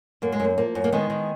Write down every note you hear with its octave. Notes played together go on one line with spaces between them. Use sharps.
F#2 A#3
G#3
F#2 A#3
F3 A#3
F#2
A#3
D#3 G#3 B3
D#3